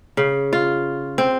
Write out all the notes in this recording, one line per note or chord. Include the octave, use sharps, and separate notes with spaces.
C#3
F4
C4